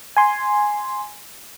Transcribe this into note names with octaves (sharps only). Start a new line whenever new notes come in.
G#5 C6